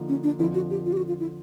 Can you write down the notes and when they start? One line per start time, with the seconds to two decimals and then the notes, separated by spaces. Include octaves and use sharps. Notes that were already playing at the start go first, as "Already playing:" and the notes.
Already playing: D3 F3 A#3 D#4
0.08 C#4
0.23 D4
0.39 F2 D3 F3 E4
0.54 F#4
0.70 G4
0.86 F4
0.93 G4
0.97 F#4
1.08 F4
1.20 E4